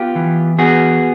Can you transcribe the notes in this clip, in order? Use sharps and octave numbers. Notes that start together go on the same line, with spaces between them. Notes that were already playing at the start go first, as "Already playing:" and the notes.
Already playing: B3 F4 G4
E3
B3 F#4 G#4